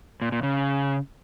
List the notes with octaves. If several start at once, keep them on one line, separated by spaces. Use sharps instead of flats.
A#2
A#2
C#3